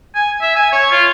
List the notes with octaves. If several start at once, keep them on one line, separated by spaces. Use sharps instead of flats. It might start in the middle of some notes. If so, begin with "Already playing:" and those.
G#5
E5
G#5
C#5
F4